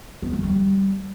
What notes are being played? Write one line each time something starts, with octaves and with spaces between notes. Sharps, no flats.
B3
A3
G3